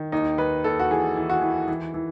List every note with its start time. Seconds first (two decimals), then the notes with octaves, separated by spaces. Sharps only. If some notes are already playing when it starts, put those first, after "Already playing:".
Already playing: D#3
0.12 D#2 D#4
0.38 D#2 B4
0.64 D#2 A4
0.80 F#4
0.90 E3 G#4
1.17 E3
1.30 F#4
1.42 E3
1.68 E3
1.94 E3